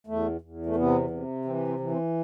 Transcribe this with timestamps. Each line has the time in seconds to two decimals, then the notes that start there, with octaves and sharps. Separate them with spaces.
0.07 E2 A3
0.41 E2
0.66 A3
0.76 C3 B3
1.10 C3
1.45 E3 C4
1.68 C4
1.80 E3
1.91 C4